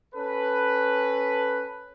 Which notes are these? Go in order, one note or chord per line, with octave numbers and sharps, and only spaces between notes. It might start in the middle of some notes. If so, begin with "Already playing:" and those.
C#4 A4 B4